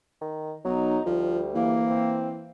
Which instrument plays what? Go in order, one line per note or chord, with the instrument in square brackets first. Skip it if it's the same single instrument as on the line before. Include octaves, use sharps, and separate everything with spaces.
[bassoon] D#3
[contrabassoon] B1 [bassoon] F#3 [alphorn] D#4
[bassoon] D2 [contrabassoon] F3 [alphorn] G3
[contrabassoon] E3 [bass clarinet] A#3
[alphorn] C4